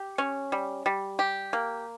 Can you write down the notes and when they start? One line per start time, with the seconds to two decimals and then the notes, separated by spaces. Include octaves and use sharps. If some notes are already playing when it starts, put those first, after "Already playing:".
Already playing: G4
0.18 C#4
0.52 G3
0.86 G3
1.19 G4
1.53 A#3